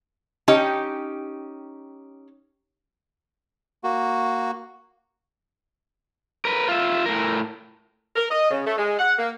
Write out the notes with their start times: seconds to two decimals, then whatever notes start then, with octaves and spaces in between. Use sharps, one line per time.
0.48 C#4 D#4 G4
3.84 A#3 F#4
6.45 A#4 B4
6.68 F4 E5
7.06 A2 A#4
8.16 A#4
8.30 D#5
8.51 C#3
8.66 A3
8.78 G#3
8.99 F#5
9.19 A#3